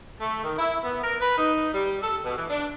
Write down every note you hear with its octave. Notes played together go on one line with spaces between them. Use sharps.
A3
D#3
E4
B3
A#4
B4
D#4
G3
A4
B2
E3
D4